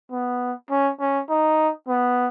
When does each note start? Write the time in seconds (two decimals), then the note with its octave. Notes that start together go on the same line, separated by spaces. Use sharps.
0.11 B3
0.70 C#4
1.00 C#4
1.29 D#4
1.88 B3